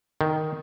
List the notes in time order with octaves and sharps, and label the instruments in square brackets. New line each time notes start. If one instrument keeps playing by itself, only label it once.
[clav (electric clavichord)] D#3